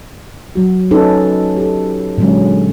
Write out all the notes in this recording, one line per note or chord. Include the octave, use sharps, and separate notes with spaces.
F#3 F#4
C#4 D#4 A4 B4
G4 A4
A#2 D3 F#3 G#3 C#4